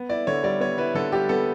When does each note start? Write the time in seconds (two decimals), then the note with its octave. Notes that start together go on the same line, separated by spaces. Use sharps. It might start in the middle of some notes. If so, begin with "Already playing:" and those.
Already playing: B3
0.09 E4 D5
0.27 D3 C#5
0.43 G3 D5
0.60 B3 C#5
0.78 E4 B4
0.95 D3 A4
1.12 G3 G4
1.29 B3 A4